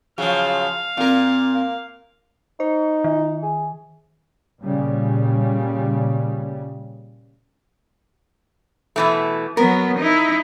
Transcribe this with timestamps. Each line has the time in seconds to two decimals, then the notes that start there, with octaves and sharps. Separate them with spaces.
0.18 C#3 F3 F#3 F5
0.97 A#2 A#3 C4 A#4
1.54 A#3
2.60 D#4 C5
3.04 D#3
3.43 G#4
4.60 A#2 C#3 G3
8.96 B2 E3 A3
9.57 F#3 B3 A#4
9.98 D#4 E4